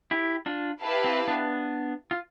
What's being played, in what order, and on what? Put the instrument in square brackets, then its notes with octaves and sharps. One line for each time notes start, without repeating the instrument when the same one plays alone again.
[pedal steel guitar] E4 G4
D4 F4
[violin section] E4 G4 B4 F5 A5
[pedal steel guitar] C4
B3 D4
F4